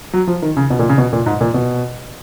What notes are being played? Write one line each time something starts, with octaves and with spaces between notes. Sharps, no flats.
F#3
F3
D#3
C#3
B2
A#2
C#3
B2
A#2
G#2
A#2
B2